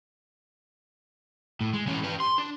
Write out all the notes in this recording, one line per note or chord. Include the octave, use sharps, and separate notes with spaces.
A2
G#3
E3 C#4
G4 B4
C6
D4